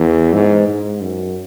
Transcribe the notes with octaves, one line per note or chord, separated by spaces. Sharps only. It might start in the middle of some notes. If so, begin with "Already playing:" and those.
Already playing: E2
G#2
G#2
F#2